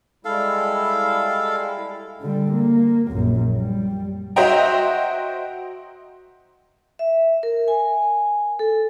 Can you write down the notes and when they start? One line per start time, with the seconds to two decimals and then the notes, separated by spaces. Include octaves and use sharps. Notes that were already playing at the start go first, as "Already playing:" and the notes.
0.25 G3 G#3 E4 A4 F5
2.21 D3 G3
2.51 A#3
3.08 A#1 F#2
3.56 G3
4.36 F#4 C5 D#5 E5 G5 A#5
6.99 E5
7.43 A#4
7.68 G#5
8.59 A4